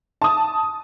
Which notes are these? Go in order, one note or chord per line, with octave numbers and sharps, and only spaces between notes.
A5 D#6